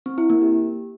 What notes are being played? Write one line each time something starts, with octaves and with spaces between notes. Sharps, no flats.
C4
E4
A#3
G4